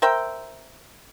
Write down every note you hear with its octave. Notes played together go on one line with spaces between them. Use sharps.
A#4 C5 E5 G5